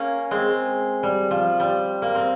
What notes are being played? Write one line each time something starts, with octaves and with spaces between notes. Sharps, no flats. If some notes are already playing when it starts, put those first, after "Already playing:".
Already playing: A#3 C#4
G#3 C4
G3
F3
G3
A#3
C4